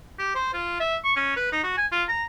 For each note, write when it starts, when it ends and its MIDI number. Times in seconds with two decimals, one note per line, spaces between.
0.19 0.31 67
0.35 0.52 72
0.53 0.78 65
0.80 0.97 76
1.05 1.12 85
1.17 1.36 61
1.36 1.47 71
1.52 1.60 63
1.64 1.77 66
1.78 1.87 80
1.92 2.03 65
2.09 2.24 82